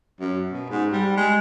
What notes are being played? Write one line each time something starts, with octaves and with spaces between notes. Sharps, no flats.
F#2
B2
G#2
G3
G#3